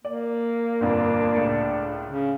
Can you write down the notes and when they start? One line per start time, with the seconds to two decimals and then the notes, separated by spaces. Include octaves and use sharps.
0.05 A#3 D5
0.80 G1 F2 A#2 D4
1.35 C#2 A2 C#7
2.08 C#3